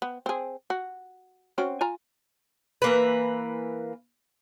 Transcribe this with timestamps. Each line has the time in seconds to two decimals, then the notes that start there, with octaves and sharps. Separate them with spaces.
0.02 B3
0.26 C4 G#4
0.70 F#4
1.58 C4 C#4 F#4
1.81 F4 G#5 A#5
2.82 E3 A#3 B4